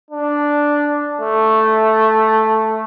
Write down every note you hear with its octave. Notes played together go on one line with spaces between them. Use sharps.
D4
A3